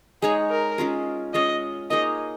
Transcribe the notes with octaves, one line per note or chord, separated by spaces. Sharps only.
G#3 D#4 G#4 C#5
A#4
G#3 C#4 F4 G#4
G#3 C#4 F4 C#5 D#5
A#3 D#4 G#4 C#5 D#5